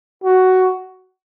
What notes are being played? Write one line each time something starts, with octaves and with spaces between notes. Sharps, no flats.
F#4